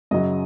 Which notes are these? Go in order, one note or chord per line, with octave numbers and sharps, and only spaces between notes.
F#2 C#3 F#3 D#5